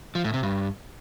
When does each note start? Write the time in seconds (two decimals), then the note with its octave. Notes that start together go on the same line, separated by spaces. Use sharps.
0.15 F3
0.24 A2
0.34 C3
0.43 G2